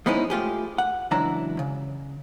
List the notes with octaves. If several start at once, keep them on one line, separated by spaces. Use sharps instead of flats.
F3 G#3 B3 C#4 D#4 E4
A3 F4 G4 G#4
F#5
C#2 E3 F#3 D4 E4 A#5
C#3